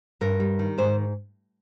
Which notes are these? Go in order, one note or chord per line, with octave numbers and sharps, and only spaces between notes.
G2 A#4
G3
D#3
G#2 C5